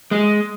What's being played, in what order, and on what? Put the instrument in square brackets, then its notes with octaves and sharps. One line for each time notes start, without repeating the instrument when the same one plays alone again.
[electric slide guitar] G#3